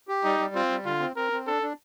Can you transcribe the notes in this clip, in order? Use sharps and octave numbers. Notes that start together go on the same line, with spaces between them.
G4
G3 D#4
G3
C4 F4
G3
D3 F4
C4
C4 A#4
C4
D4 A4
D4